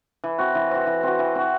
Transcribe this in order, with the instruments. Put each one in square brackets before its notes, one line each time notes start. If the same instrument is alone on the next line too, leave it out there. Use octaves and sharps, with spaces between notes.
[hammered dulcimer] E3
C4 F#4
E3
C4 F#4
E3
C4 F#4
E3
C4 F#4